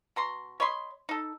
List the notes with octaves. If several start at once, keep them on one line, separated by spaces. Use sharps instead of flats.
B2 A#5 C6
C#5 D#5 B5 C6
D#4 A4